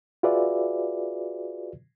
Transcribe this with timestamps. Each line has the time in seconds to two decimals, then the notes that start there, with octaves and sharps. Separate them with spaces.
0.23 F4 F#4 G#4 B4 D5 E5